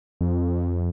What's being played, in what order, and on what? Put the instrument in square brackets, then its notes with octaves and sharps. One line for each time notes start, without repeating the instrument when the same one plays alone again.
[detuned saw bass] F2